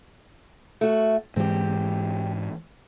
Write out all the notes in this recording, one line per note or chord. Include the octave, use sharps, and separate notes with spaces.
A3 F#4
G#2 E3 G#3 C4 G4